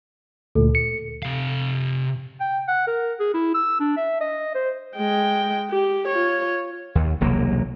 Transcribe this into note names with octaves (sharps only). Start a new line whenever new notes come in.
D2 A#2 A4
C#7
C3 F5
G5
F#5
A#4
G#4
E4
E6
D4
E5
D#5
C5
G#3 G5
G4
F4 C#5
D#2
E1 C2 F#3 A#3